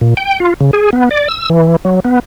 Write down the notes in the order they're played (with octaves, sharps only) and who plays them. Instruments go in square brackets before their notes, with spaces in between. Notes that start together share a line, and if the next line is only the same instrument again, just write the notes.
[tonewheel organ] A#2
G5
F4
C#3
G#4
B3
D5
E6
E3
F#3
B3